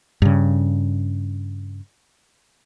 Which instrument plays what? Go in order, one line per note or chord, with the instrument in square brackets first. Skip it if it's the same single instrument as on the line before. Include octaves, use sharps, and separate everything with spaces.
[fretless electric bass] G2 C#3